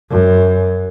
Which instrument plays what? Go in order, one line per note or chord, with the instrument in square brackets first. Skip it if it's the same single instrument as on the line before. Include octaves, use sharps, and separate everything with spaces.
[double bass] F#2